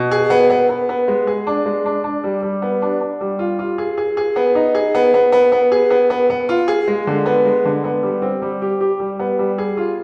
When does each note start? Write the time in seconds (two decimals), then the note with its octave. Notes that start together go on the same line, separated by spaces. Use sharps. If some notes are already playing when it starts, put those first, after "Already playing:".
Already playing: B2
0.11 G#4
0.30 B3
0.50 B3
0.69 B3
0.89 B3
1.08 G#3
1.27 G#4
1.47 D4
1.66 G#3
1.86 D4
2.04 D4
2.24 G3
2.43 G3
2.62 B3
2.82 D4
3.01 D4
3.21 G3
3.39 F4
3.59 F4
3.78 G#4
3.98 G#4
4.17 G#4
4.36 B3
4.55 D#4
4.75 G#4
4.95 B3
5.14 B3
5.32 B3
5.52 B3
5.72 G#4
5.90 B3
6.10 B3
6.30 B3
6.49 F4
6.68 G#4
6.88 G#3
7.07 D3
7.26 B3
7.45 G#3
7.65 D3
7.84 B3
8.03 G3
8.22 C4
8.42 G3
8.62 G4
8.81 G4
9.00 G3
9.19 B3
9.39 G3
9.58 G#4
9.77 F4